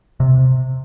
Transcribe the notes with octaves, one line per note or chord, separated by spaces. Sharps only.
C3